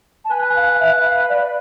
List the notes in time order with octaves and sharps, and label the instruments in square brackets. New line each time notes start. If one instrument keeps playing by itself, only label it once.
[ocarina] A5
[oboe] B4 [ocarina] G#5
[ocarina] G#5
F5
E5
F5
D5